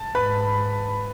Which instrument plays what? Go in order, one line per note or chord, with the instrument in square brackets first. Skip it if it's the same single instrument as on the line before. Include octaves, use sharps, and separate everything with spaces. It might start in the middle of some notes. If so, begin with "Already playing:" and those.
Already playing: [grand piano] A5
[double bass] G#2 [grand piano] B4 B5